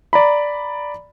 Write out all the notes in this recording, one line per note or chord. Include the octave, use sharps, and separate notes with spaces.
D5 A#5 B5